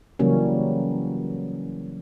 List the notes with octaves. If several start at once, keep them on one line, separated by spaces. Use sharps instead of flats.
C#3 E3 F#3 G3 A#3 C#4